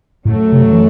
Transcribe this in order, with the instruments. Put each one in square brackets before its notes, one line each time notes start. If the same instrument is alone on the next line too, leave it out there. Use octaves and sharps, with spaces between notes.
[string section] F#2 F#3 A3 [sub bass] A2
[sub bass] C3
E3